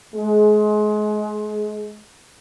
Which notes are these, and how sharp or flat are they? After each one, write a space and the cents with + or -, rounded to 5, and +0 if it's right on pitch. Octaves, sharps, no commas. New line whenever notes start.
G#3 +30